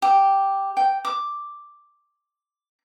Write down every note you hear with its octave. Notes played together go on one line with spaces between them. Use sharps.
G4
G5
D6